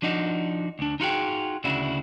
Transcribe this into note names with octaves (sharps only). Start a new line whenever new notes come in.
F3 D4 D#4 F#4
D2 D4
D#4 F4 F#4 G#4 G5
D2 C#3 D4 E4 F#4